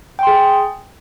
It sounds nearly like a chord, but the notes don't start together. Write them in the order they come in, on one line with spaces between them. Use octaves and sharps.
G5 C6 G#4